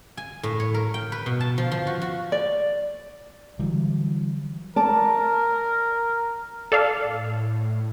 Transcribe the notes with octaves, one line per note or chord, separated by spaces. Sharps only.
G#5
A2
C#5
A#4
G5
B4
B2
A5
F3
F3
F#4
F#4
D5
D3 E3 F#3 G3
A#4 D5 A5
A4 D5 F5
A2